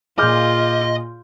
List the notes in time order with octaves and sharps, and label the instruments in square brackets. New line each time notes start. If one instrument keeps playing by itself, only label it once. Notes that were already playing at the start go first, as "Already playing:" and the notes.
[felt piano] A#2 G#4 [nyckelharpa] F4 [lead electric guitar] D#5 [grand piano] D6 F6 G6